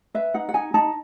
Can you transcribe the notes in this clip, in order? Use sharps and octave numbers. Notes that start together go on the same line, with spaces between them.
B4 E5
D#4 F#5
F#5
D#4 G#5
D#4 A5